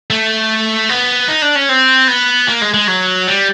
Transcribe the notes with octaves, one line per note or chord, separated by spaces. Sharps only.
A3
B3
D#4
D4
C#4
C4
B3
A#3
G#3
G#3
F#3
G3